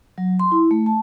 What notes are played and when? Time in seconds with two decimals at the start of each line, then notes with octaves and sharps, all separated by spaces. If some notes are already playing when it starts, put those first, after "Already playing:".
0.18 F#3
0.40 C6
0.52 E4
0.71 A3
0.86 A5